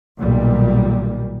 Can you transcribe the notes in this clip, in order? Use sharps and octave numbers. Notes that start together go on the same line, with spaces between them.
B1 A#2 D#3 G3